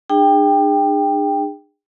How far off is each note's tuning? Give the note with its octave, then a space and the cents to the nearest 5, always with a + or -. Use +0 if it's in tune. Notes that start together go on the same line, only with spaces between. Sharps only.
D4 +40 G#4 -30 G5 +10